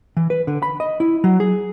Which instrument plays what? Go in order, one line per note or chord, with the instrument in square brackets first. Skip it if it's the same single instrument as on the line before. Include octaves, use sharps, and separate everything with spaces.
[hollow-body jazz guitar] E3
B4
D3
B5
D#5
E4
F#3
G#4